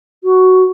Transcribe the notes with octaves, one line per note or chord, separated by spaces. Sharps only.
F#4